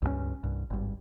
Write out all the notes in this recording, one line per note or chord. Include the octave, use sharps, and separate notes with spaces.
C#2 G2 F#3 C#4
C2 G2
G#1 G2